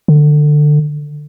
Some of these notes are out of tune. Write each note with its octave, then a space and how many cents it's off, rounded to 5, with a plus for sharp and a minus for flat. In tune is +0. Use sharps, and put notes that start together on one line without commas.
D3 +20